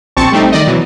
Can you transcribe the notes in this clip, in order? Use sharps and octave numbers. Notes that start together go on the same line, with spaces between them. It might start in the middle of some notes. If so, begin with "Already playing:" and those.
A#1 C4 A5 C#6
G3 A3 C4 D#4
D#3 D5 D#5
B2 E3 F#3